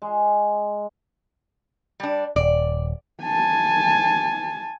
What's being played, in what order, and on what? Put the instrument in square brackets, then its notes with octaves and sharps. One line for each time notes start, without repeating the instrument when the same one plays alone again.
[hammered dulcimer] G#3
[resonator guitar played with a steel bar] G3 D4
[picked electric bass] D#1 [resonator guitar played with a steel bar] D5
[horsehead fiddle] G#5 A5